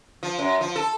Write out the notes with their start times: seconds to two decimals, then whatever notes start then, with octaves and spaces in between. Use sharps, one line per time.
0.23 F3
0.38 F#2
0.61 F3
0.76 A4